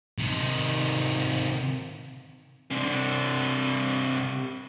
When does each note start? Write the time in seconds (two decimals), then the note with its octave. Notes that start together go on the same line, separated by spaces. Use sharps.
0.18 C3 D#3
2.71 C3 D4